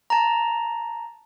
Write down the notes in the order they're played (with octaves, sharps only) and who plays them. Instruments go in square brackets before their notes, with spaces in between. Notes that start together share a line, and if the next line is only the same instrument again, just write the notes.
[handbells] A5 A#5